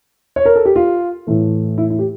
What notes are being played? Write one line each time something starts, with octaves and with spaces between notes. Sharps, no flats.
C#5
A#4
A4
G4
F4
A2 E3 A3
E4
E4
G4